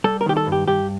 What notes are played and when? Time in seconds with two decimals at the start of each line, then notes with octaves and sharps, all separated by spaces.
0.04 G3 A4
0.21 A#4
0.26 D#3 G4
0.37 A4
0.47 G2
0.52 G4
0.68 G2 G4